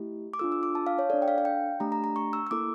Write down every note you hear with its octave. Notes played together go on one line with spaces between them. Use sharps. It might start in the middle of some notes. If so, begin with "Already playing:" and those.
Already playing: A3 E4 G4
D6
D4 F4 A4 E6
E6
D6
A5
F5
C#5
D4 A4 D5
G5
F5
F5
G5
A3 D4 G4 A#5
A#5
A#5
C#6
E6
E6
A#3 E4 A4 D6